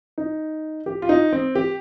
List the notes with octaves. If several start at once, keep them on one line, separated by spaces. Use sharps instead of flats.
D#4
G4
F4
D#4
C4
G4